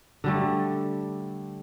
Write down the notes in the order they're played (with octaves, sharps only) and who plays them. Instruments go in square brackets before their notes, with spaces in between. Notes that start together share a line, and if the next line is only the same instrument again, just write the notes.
[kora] D3 G3 A3